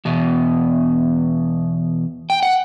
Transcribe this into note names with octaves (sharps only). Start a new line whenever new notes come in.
E2 B2
G5
F#5